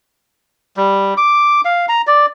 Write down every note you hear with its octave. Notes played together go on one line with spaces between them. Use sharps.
G3
D6
F5
A#5
D5